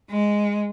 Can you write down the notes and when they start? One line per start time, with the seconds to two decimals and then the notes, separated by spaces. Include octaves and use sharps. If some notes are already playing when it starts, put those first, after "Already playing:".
0.10 G#3